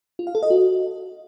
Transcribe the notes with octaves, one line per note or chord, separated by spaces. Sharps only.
F4
F5
A4
D#5
F#4